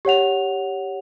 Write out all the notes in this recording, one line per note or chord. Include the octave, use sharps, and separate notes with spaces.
G4 C#5 F#5 F7